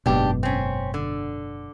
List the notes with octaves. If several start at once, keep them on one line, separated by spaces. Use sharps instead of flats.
F#1 G#2 B2 D4 G4
C4 C#4
D3